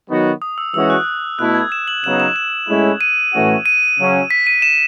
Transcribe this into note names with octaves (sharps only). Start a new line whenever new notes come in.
D#3 F#3 B3 D#4 F#4
D#6
E6
E3 G#3 C#4 F#4 E6
F#6
B2 A3 E4 F#6
G#6
E7
F#7
C#3 F#3 B3 D#4 E7
E7
E7
A2 G#3 C#4 E4
D#7
A2 E3 A3 C#4 F#4
D#7
C#3 F#3 C#4
B6
D#7
E7